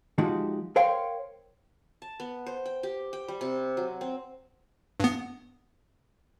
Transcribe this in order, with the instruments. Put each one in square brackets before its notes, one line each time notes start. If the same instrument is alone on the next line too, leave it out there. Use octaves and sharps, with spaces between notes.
[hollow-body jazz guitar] F3 G#3 D#4 F#4 G4
A#4 C5 C#5 F5 G5 C6
[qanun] A5
B3
C5
G5
G4
G5
G3
C3
F#3
C4
[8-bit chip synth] G2 B3